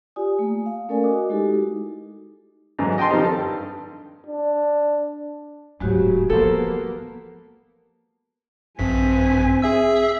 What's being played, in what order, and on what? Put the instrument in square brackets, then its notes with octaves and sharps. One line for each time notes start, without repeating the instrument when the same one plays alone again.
[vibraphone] F4 G4 D5 G#5 D#6
A3 A#3
F5
A3 C#4 A4 A#4 D5 G#5
F#4 D#5 D6 D#6
G#3 D#4 E4 F#4 G4 A4
[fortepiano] G#2 D3 E3 F#3
D#5 G5 A5 C6
D#3 F3 G3 C4 D#4
A4 A5
G2
[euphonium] D4
[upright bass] D1 G#2 [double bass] C#3 F#3 [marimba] G#3 F#4 G4
[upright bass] E3 F3 [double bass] A#3 B3 [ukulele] A4 C5
[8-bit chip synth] A#1 G2 B6 [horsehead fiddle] C4 G#5
[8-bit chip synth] G#4 E5 E6